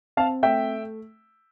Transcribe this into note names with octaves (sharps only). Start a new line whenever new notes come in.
C4 F5 A5
A3 E5 G5